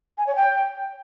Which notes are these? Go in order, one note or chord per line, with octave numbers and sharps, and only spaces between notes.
G#5
C#5
G5